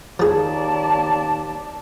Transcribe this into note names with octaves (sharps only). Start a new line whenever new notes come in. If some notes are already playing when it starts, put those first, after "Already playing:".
D#2 F3 G#4 D5 A5